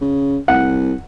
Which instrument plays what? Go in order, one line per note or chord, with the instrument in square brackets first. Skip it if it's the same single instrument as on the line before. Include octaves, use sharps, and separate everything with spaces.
[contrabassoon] C#3
[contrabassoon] C2 [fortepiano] F#5